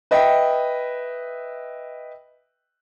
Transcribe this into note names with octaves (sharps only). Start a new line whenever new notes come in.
B4 D#5 E5 G5